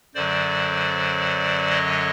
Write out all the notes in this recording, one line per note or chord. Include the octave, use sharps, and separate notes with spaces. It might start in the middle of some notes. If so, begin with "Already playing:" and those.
F#2 D3 F#3 C5 D5
C#5 D#5